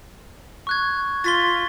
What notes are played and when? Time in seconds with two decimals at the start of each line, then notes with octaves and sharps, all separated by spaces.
0.67 C#6 F#6 G#6
1.24 F4 A6 B6 G7